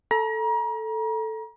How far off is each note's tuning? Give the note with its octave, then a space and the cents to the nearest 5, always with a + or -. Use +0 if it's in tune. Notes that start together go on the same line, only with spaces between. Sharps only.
A4 +0 A#5 +35